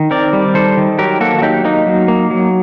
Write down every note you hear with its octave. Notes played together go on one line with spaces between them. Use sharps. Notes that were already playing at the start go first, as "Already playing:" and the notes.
Already playing: D#3
C4 A#4 D5
G3
D#3 A4 C5
D#3
F#3 G4 A#4
A#3 F#4 A4
F#4
F#3 D#4 G4
A#3 D#4
F#3
A#3
F#3